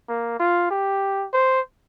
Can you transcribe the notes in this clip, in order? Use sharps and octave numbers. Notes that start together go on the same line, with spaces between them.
A#3
F4
G4
C5